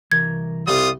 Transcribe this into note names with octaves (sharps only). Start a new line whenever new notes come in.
C2 E3 A#4 G#6
C2 G3 F4 D5 D#6